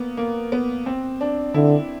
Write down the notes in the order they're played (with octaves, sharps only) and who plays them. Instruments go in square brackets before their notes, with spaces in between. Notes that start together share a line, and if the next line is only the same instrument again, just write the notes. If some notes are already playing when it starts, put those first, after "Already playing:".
Already playing: [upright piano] A#3 B3
A#3
B3
C4
D4
[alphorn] D3 [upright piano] E4